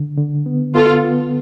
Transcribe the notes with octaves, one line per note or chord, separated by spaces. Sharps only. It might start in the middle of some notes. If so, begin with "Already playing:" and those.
Already playing: D3
D3
B3
B3 F4 A4
B3